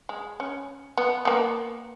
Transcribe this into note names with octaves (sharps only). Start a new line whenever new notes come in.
G#3
C#4
B3
A#3 B3